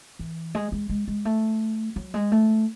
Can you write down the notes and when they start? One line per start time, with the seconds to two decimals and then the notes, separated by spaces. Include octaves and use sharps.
0.19 E3
0.55 G#3
0.72 G#3
0.89 G#3
1.08 G#3
1.25 A3
1.96 F#3
2.14 G#3
2.32 A3